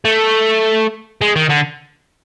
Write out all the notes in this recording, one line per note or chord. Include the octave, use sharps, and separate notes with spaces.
A3
G#3
D#3
D3